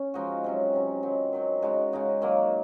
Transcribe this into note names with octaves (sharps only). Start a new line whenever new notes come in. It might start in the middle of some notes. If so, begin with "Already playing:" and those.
Already playing: C#4
F3 G#3 D#4 F#4
C3 F#3 C#4
C3 F#3 C#4
D#3 F#3 C4
D#3 F#3 C4
C#3 G#3 D#4 F#4
C#3 G#3 D#4 F#4
D#3 F#3 A#3